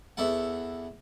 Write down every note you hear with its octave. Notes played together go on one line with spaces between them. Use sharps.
E2 E4 A4 F#5